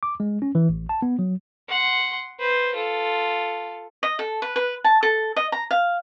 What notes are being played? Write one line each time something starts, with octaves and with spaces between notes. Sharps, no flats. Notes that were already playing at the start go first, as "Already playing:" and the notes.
D6
G#3
C#4
E3
A1
A5
B3
F#3
F#5 C6
B4 C5
F4 A4
D#5
A4
B4
B4
A5
A4
D#5
A#5
F5